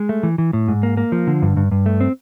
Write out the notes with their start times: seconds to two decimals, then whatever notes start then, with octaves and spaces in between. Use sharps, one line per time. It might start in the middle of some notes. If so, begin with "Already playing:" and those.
Already playing: G#3
0.09 A3
0.23 E3
0.38 E3
0.53 A2
0.68 G#2
0.83 A#3
0.97 A#3
1.12 F3
1.27 D3
1.42 G2
1.57 G2
1.71 G2
1.86 A3
2.00 C4